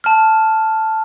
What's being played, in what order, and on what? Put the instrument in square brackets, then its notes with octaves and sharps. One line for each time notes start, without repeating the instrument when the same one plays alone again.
[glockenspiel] A5 F6